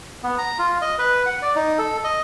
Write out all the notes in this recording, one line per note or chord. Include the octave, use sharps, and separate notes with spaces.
B3
A#5
F4
D#5
B4
F#5
D5
D#4
A4
D#5